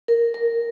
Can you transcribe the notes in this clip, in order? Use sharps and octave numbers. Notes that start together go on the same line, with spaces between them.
A#4
A#4